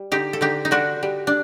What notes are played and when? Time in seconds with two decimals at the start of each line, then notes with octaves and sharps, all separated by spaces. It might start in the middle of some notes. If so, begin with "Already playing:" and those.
Already playing: G3
0.12 D3 D#4 G4
0.33 A4
0.41 D3 D#4 G4
0.65 D#4
0.71 D3 D4 F#4
1.03 G3
1.27 D4